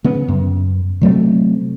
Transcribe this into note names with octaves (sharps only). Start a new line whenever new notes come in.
C#3 B3
F#2
C3 F#3 A3 C4